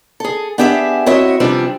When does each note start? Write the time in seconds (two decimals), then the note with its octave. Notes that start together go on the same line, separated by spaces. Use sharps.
0.20 G#4 A4
0.58 B3 D4 G4 G#4 D#5 E5
1.06 C4 E4 F#4 C#5 D#5 E5
1.40 E2 C3 F3 G3 C4 D4